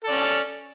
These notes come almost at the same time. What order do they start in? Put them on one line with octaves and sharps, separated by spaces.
A4 D5 C#4